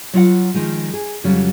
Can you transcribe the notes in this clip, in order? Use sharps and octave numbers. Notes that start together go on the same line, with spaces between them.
F#3 F4 F#5
D#3 F3 G#3
G#4
F2 C#3 F#3 G3 C#4